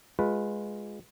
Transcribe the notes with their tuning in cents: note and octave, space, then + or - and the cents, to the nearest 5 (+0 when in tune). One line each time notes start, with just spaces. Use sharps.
G#3 +0 F4 +20 B4 +0